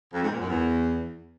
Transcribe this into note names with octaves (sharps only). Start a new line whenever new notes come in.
F2
G#2
A#2
F#2
E2